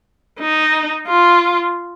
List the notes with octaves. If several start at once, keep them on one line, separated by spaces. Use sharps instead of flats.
D#4
F4